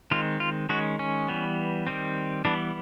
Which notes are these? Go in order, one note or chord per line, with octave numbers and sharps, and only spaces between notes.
D#3 G#3 C4 F4
F4
D#3 G#3 C#4 F#4
C#4
E3 G3 B3
D#3 G3 C4
E3 G3 B3 D4